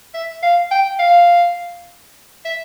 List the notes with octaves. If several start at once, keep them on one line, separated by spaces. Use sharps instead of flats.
E5
F5
G5
F5
E5